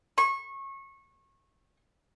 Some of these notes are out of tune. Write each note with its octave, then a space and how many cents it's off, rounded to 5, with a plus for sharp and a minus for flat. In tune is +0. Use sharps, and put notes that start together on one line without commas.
C#6 -25